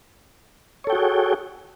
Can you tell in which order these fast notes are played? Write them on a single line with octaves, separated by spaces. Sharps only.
C#5 A4 G5 F#4 G#4